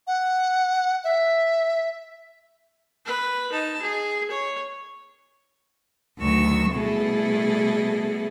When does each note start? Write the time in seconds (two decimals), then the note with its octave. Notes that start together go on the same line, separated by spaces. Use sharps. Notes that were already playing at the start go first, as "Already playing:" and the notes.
0.07 F#5
1.04 E5
3.06 B4
3.52 D#4 A5
3.82 G#4
4.31 C#5
6.19 D2 D#3 F#3 C#6 E6
6.72 B2 G3 A3 E4 G#4 A4